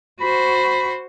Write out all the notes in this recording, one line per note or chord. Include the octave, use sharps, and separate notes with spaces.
F#4 C5 B5